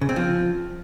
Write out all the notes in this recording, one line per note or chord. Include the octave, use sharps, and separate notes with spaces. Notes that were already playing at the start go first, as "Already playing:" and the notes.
C#3
C4
F3